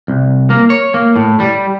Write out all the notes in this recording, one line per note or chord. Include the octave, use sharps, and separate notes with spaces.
C2
A#3
C#5
A#3
A2
G3